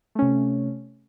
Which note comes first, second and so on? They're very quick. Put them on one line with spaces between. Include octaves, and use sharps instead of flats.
A3 C#4 C3